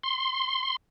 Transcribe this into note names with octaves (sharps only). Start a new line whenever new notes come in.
C6